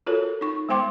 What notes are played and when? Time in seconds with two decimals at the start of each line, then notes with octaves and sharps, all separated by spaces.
0.07 F4 F#4 A4 A#4 C#5
0.41 D#4 C#6
0.69 G#3 B3 C5 G5 C6 D6